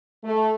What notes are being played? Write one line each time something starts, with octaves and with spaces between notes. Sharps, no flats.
A3